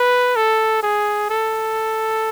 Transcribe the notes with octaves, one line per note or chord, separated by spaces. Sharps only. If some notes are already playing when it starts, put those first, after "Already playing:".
Already playing: B4
A4
G#4
A4